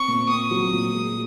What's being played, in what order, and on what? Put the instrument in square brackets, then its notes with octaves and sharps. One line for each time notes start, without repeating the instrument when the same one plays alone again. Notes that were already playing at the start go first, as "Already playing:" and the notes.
Already playing: [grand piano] C4 [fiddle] C#6
[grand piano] A#2
[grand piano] C4 [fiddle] D#6
[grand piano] F#3
A#2
G#3